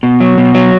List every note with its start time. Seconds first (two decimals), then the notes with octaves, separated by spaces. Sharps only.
0.03 B2
0.20 F#3
0.38 B2
0.55 F#3